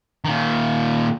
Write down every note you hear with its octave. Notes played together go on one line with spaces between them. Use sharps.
A#2 D#3